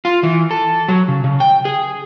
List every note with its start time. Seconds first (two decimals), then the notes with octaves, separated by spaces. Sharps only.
0.05 F4
0.23 E3
0.51 A4
0.89 F#3
1.08 C#3
1.24 C#3
1.40 G5
1.65 G#4